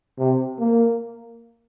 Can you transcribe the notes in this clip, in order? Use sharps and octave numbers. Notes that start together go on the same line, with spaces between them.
C3
A#3